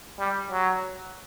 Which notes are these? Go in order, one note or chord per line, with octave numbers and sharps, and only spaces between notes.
G3
F#3